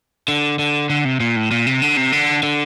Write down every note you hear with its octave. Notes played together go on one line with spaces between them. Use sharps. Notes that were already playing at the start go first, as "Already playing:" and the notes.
D3
D3
D3
C3
A#2
A2
A#2
C3
D3
C3
D3
D3